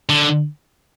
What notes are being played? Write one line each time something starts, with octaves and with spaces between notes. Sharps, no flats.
D3